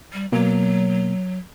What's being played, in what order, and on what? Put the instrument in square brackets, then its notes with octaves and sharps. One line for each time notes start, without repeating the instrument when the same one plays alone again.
[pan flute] G3
[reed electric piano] B2 A#3 [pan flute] F#3